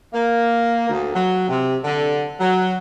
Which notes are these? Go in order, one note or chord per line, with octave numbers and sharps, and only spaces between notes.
A#3
D2
F#3
C3
D3
F#3